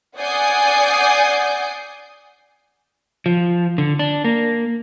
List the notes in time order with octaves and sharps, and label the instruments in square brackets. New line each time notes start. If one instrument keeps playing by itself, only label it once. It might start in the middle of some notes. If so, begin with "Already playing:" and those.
[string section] D5 F#5 G#5 D#6 G6 C7
[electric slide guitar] F3
D3
D4
A#3